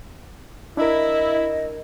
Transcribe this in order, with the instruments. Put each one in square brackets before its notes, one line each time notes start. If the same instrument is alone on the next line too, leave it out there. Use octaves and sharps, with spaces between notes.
[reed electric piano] D4 A#4 [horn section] E4 [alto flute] D#5